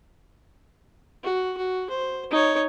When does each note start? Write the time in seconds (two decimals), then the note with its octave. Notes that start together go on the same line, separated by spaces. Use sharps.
1.24 F#4
1.58 F#4
1.90 C5
2.31 D#4 C#5